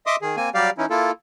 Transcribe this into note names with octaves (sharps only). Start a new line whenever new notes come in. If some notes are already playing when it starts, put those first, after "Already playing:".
D#5 E5 C6 D6 D#6
D#3 G#4
A#3 C4 G#5
F#3 G3 G4 D5 F5
E3 C#4 D#4 E4
A#3 E4 F4 A4